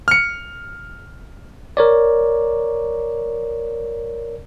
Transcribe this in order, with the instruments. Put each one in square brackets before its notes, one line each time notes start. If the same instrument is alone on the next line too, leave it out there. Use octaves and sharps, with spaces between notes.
[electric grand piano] F6 C#7
[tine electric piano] A#4 C#5 D5